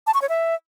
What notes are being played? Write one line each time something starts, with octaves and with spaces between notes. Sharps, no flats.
A5
C#6
C#5
E5